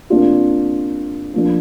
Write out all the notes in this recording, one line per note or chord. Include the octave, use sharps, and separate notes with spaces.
C3 A#3 D4 F4
F3 A#3 D4